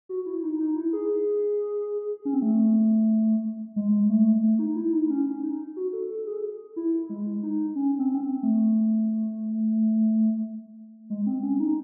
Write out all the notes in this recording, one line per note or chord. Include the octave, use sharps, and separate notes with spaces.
F#4
E4
D#4
D#4
E4
G#4
C#4
C4
A3
G#3
A3
A3
D#4
E4
D#4
C#4
C#4
D#4
F#4
A4
A4
G#4
E4
G#3
D#4
C#4
C4
C#4
C4
A3
G#3
C4
C#4
D#4